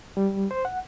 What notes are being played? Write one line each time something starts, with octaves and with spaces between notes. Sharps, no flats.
G3
C5
F#5